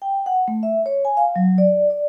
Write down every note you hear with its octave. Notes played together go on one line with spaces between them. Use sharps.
G5
F#5
A3
E5
C#5
G#5
F5
F#3
D5
D5